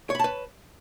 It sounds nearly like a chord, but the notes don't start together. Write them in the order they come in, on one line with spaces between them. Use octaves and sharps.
C#5 B5 A5 B4